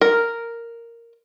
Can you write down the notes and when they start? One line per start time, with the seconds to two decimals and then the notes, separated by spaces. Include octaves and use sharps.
0.01 A#4